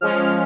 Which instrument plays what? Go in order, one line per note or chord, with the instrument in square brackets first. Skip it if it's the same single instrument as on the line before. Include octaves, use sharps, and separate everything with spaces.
[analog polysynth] F3 G#3 C#4 F6